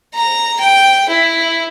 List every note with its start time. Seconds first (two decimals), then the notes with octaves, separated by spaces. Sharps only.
0.14 A#5
0.60 G5
1.09 E4